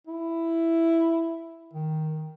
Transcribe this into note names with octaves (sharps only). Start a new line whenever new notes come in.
E4
D#3